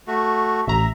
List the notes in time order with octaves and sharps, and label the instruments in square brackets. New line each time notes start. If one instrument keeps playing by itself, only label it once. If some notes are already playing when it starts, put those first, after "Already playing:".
[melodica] A3 F#4
[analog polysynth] A1 A#5 [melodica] E5